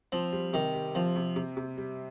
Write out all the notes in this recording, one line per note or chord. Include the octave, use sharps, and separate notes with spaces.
F3 C4
G3
C3 D#3
G3
F3 C4
C3
C3
C3
G3